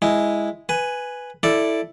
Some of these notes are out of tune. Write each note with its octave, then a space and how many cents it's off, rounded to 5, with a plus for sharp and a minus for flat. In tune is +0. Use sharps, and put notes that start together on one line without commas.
G#3 +0 E4 +0
B4 +0 G#5 +0
E4 +0 A4 +0 D5 +0